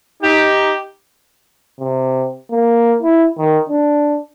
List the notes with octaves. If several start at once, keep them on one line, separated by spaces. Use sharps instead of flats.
D#4 G4
C3
A#3
E4
D#3
D4